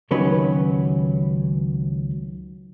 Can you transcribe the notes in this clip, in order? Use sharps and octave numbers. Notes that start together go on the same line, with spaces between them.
C#2 D#3 F#3 C#4 G4 B4